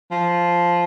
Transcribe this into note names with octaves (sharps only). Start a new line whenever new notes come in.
F3